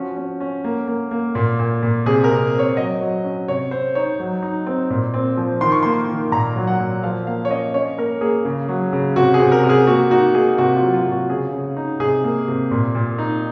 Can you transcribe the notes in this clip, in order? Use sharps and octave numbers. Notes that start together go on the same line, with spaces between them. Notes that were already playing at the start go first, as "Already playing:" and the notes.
Already playing: F3 C#4 F#4
C#4
C#4
A#3
A#3
A#3
A#2
A#2
A#2
C3 G#4
A#4
C3
C4
C#5
F#3 D#5
F#3
C#4
C3 C#5
C4 C5
D#4 C#5
F#3
D#4
C4
A#2
C4
F3
D#3 C6
C#6
A#3 C6
D#3
A#2 A#5
F#3
F#5
A#2
F3 F5
A#3 F5
C#5
C#4 D#5
C#4 C#5
A#3 A#4
A#3 G#4
C#3
F#3
C#3
C3 F#4
G#4
C3
A#4
C3
G#4
A#3 F#4
D#4 F#4
A#3 G#4
C3 F#4
F4
F#3
F4
C3
F#4
C#3 G#4
C#3
D#4
C3 G#4
A#3
C3
A#2
A#2
D#4